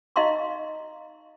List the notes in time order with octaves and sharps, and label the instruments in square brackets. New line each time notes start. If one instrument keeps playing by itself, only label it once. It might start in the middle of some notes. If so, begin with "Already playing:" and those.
[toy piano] D#4 D#5 F5 A#5 C6 C#6